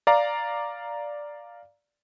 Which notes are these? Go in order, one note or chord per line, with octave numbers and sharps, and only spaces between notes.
D5 F5 A#5